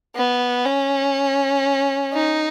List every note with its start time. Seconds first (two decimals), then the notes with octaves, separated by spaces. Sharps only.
0.16 B3
0.66 C#4
2.13 D#4